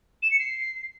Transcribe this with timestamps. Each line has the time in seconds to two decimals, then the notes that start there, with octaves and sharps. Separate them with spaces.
0.22 E7
0.30 C#7
0.39 C7